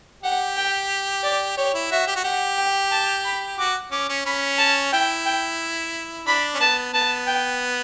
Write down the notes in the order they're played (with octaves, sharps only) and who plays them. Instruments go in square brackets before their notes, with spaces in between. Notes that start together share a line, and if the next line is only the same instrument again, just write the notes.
[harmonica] G4 [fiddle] F#5
[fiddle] G5
D5
[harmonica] G4 [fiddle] C#5
[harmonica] E4
[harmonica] F#4 [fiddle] E5
[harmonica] G4
F#4
[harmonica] G4 [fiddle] F#5
[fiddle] G5
A5
B5
[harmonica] F#4 [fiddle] D6
[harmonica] C#4 [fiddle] D6
[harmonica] C#4
[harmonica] C#4 [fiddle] B5
[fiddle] A5
[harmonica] E4 [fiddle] G5
[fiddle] G5
[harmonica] D4 [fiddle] B5
[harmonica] C#4
[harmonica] B3 [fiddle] A5
[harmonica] B3 [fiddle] A5
[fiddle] G5